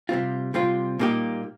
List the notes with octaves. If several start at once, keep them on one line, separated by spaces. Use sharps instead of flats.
C3 G3 C4 F4
C3 G3 C4 F4
A#2 G3 A#3 D#4 G4